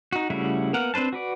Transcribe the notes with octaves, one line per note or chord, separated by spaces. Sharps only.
D#4 F#4
C#3 G3 A3 E4 F#4
A#3 B3 A#4 F#5
C4 D4 B4 C5 A5
F#4 B4 D5